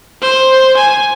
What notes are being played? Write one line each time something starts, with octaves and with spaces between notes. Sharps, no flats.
C5
G#5